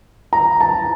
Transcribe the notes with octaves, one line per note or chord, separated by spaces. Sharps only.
A#5
A5